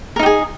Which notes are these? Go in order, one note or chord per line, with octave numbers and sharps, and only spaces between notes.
D#4 G4 G#4 A#4